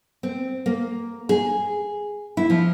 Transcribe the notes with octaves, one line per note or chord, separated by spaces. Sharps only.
C4
A#3
G#4
E4
F3